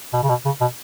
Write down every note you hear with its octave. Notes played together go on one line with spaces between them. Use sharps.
B2
C#3
B2
C#3
B2